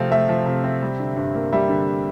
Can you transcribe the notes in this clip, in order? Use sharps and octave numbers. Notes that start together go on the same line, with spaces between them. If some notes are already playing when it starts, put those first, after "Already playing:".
Already playing: C3 F3 A3 C4 F5
A3 E5
F3
C3
C4
G3
D3
G2
A#3
G3 E5
D3